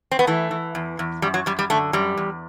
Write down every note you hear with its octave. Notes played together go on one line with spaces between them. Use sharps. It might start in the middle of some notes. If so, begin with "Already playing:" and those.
C4
B3
E3 A3
E3
E2
E2
F#2 G3
F#3
F#2 G3
G3
D3 A3
F#2 G3
E2